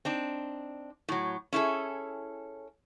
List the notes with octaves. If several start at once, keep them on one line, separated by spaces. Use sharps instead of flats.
C4 D4 D#4
A2 F#3
C#4 E4 G#4 A4